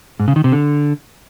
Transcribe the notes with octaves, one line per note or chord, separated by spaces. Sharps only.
G#2
C#3
D#3
C3
D3